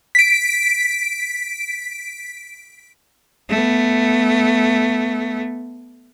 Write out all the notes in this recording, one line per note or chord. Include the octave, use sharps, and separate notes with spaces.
B6 D7
A3 B3